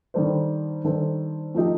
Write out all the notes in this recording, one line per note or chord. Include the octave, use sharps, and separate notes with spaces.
D#3 G3 D4 A4 C5
D#3 G3 D4 A4 C5
F3 A3 D#4 G4